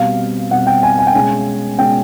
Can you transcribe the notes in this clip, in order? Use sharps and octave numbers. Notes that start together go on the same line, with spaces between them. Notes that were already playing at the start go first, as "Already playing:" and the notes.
Already playing: B2 G3 C4 F5
B2 G3 C4 F#5
G5
G#5
G#5
G5
B2 G#3 C#4 G#5
B2 G#3 C#4 G5